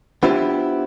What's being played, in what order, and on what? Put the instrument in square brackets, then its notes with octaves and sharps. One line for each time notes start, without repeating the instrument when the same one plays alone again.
[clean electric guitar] B3 D4 E4 F4 G4 C5